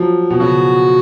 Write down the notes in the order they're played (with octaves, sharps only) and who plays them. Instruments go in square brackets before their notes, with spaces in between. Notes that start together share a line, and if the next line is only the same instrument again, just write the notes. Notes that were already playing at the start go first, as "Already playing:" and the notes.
Already playing: [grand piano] F3 F#3
B2
[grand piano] C#3 [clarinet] F#4